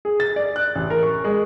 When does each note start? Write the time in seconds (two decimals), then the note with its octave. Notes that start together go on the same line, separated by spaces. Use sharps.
0.05 G#4
0.20 A6
0.36 D5
0.56 F#6
0.75 A1
0.90 A#4
1.03 C#6
1.24 G#3